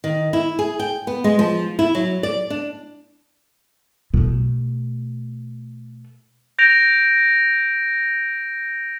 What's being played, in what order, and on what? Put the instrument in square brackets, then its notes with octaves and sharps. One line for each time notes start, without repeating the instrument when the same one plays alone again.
[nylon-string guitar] D#3
E4
G#4
G5
B3
G#3
F3
E4
F#3
D5
D4
[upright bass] B2 A3
[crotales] G6 A#6 D7 F7